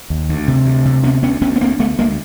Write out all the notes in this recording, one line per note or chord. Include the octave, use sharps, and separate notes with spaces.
D#2
D2
C3
D2
C3
D2 B3 C#4
D2 B3 C#4
D2 B3 C#4
B3
D2 A#3 C4
D2 A3 B3
D2 G#3 A#3